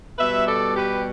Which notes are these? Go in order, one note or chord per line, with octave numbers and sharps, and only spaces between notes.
B2 G3 B4 E5
A4 D5
G4 B4